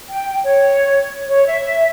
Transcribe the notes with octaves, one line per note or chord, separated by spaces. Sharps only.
G5
C#5
C#5
E5